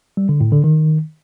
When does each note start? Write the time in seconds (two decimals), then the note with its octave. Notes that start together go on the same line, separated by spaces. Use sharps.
0.17 G3
0.29 D3
0.41 A2
0.52 D3
0.64 D#3